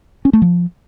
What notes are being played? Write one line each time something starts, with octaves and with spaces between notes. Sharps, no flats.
C#4
A3
F3